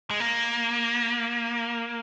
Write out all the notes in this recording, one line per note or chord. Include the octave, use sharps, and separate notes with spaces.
G#3
A#3